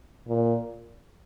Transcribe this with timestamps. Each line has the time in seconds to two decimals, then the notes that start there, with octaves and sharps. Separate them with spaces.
0.28 A#2